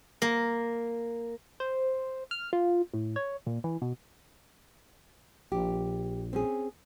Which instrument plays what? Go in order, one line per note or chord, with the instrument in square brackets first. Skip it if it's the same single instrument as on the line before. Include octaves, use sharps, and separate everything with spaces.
[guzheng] A#3
[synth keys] C5
F6
F4
A2
C#5
A#2
E3
B2
[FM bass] A#1 [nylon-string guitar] G4
[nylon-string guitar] C4 C#4 G#4